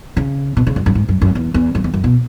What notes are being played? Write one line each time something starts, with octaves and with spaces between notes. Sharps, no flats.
C#3
B2
C#3
F#2
F#2
G#2
F#2
F#2
E2
E2
F#2
E2
F#2
B2